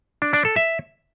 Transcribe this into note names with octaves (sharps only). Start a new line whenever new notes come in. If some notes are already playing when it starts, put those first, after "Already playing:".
D4
D4
A4
E5